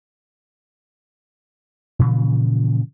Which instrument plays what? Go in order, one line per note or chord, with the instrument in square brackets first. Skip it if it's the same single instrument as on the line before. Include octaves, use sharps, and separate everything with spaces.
[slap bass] A#2 C#3 E3 F3